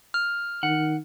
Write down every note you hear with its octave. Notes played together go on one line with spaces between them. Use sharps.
F6
D#3 F#5